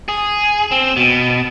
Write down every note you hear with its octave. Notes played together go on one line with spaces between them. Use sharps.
G#4
C4
B2